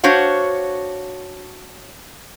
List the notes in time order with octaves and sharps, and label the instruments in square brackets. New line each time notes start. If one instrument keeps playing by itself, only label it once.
[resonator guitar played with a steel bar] D4 F#4 C5 C#5 F5